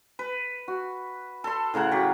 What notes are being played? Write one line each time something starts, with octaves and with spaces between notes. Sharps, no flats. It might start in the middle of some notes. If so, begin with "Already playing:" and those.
B4
F#4
A4 C6
A2 C#3 A#4 F#5
F#3 G4